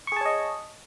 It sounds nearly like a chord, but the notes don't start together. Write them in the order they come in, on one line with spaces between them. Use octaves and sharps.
C#6 G#4 A5 C#5 D#5